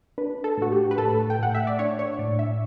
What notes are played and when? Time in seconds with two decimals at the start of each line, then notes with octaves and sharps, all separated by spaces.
0.18 D4 B4
0.44 A4
0.57 A2 F#4
0.72 G4
0.91 B4
0.98 A2 A4
1.30 G5
1.39 A2 F#5
1.55 E5
1.67 D5
1.79 D4 C#5
1.99 C#5
2.19 A2 D5
2.39 E5